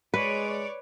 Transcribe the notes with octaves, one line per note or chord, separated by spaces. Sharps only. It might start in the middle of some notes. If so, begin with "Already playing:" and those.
G#3 B4 C#5 D5